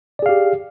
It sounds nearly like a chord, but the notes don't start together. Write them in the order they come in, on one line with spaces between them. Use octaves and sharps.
D5 G#4 F5 G4